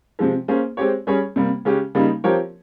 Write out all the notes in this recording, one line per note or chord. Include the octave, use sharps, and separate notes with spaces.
C3 F3 G#3
A#3 C#4 G#4 C5
G#3 C4 G4 C#5
G3 C#4 G#4 C#5
C3 G3 A#3
C#3 G#3 C#4 G4
C#3 G3 A#3 D#4
F3 C4 G4 A#4 C#5